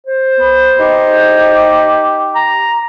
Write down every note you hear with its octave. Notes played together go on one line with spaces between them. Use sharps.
C5
B3
D#4 G4
A#5